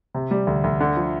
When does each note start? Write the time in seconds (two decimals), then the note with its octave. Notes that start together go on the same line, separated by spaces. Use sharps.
0.15 C3
0.31 G3
0.47 D2
0.64 D2
0.81 D3
0.97 F3